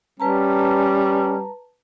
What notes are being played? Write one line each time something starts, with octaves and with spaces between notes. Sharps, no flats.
G3 C#4 B4 A5 A#5